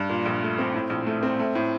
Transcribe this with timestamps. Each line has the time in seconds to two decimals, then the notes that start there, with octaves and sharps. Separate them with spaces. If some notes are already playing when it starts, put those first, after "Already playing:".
Already playing: G2
0.09 A#2
0.25 A#1
0.42 A3
0.58 C4
0.74 A2
0.90 A#1
1.07 A3
1.23 C4
1.39 A3
1.55 A2